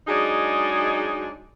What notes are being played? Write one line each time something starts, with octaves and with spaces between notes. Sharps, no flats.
F#3 G#3 D4 D#4 G#4